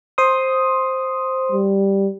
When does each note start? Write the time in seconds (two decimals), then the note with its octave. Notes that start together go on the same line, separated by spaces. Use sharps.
0.18 C5 C6 D#6
1.52 G3